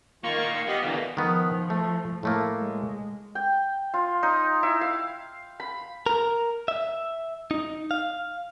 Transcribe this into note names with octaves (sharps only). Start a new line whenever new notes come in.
D#3 A#3 F4 C#6
A#2 A#3
F5
B3 G4 D#5 F5
B2 D3 E3 A#3
D#3 F3 B3
A3
A2 A3 A#3
G#3
G5
F4
D#4
E4
F5
B5
A#4
E5
D#4
F5